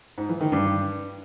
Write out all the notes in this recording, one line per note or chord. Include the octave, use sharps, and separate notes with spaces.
G#2
E3
D#3
G2